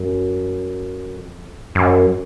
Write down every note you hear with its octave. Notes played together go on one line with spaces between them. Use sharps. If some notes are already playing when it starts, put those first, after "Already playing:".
Already playing: F#2
F2
F#2